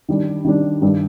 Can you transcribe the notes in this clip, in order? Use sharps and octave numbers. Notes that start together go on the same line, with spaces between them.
D#3 G3 D4
D#3 G3 D4
G2 D#3 G3 D4